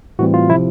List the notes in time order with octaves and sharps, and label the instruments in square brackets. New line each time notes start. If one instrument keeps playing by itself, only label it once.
[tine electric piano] A2 E3 G3 C4 F#4
F4
C3 F3 E4